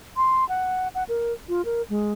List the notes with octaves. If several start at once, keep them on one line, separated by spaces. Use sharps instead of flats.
C6
F#5
F#5
A#4
F4
A#4
G#3